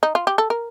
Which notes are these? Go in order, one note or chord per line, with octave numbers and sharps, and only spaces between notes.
D#4
F4
G4
A4
A#4